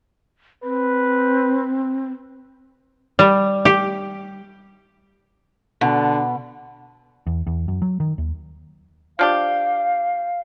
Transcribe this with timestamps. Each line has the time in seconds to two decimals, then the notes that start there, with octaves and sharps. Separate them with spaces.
0.64 C4 B4
3.19 G3
3.65 G4
5.81 B2 D3
7.27 E2
7.47 E2
7.68 F#2
7.82 F#3
8.00 D#3
8.18 D#2
9.19 F3 D4 G4 F5